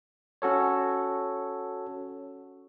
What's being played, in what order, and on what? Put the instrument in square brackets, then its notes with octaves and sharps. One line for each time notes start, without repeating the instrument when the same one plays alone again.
[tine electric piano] C#4 F#4 A4 C#5